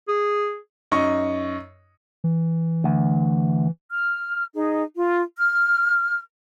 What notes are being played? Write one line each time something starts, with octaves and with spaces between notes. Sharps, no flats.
G#4
F#2 D#4 D#5 C#6
E3
D2
F6
D#4 G#4
F4
F6